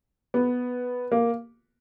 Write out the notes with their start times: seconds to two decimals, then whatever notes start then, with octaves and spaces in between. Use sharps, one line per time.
0.34 B3
1.12 A#3